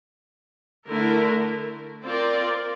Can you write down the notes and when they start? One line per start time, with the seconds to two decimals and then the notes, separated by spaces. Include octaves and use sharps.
0.88 D3 A3 E4 A#4
2.03 C4 F4 A#4 D5